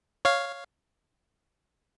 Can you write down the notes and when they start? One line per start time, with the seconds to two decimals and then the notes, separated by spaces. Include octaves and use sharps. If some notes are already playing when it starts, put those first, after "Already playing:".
0.25 C#5 F5